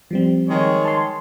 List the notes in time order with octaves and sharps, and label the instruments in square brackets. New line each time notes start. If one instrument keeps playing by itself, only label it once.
[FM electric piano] F3 G3 C4
[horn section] D#3 G#3 C#5
[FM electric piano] A5 C6